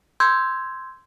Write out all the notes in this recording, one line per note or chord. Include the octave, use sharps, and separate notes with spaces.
C6 E6 G6 G#6